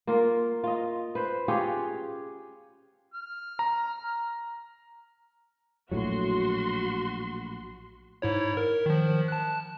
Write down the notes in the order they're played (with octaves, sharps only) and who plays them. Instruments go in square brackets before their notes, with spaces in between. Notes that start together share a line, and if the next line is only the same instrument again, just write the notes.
[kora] A#3 F4 A#4
F4 D#5
B4 C5
C#4 F4 G4 G#4
[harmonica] F6
[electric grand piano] A#5
[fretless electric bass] A#1 A2 F#3 [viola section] F#4 C6
[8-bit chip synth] G#2 E4 C#5
A#4
D#3 F3
A5 F#6